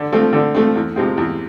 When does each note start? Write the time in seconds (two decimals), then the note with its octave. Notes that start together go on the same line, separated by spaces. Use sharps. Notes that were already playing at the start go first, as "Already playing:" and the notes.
Already playing: D3
0.12 F3 A3 C4
0.33 D3
0.55 F3 A3 C4
0.75 E2
0.96 C3 F3 G#3 C4
1.17 E2